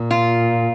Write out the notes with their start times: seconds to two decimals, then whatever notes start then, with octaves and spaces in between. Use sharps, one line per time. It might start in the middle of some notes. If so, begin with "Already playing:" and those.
Already playing: A#2
0.11 F4